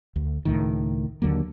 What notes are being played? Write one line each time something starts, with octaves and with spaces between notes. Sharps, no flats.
D2
C#2 A2 D#3
D#2 D3 F#3 A#3